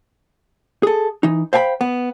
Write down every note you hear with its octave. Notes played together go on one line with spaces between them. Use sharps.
G#4 A4
E3 D#4
C5 F5 G5 G#5 B5
B3